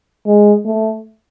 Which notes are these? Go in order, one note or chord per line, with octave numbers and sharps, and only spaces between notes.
G#3
A3